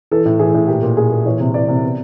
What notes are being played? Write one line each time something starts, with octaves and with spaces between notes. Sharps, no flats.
E3 A4
A2
E3 G#4
A2
A#2 G4
A#2
A#2 G#4
A#2
E3 C#5
C3
E3 D5
C3
B2